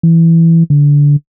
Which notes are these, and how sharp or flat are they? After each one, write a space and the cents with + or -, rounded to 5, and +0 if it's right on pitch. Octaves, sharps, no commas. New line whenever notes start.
E3 +5
D3 -20